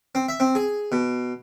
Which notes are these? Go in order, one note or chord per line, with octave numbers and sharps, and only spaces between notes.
C4
E5
C4
G#4
B2